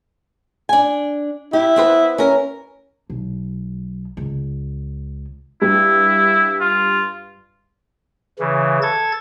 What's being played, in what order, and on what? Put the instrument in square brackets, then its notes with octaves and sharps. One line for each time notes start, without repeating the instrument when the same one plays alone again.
[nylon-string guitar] D4 G#5
[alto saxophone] E4 [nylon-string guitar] G4
[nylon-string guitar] B3 C4 B4
C#4 A#4
[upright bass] B1
C#2
[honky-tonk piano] G2 [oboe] E4
[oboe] F4
[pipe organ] C#3 E3
A4 G#6 A6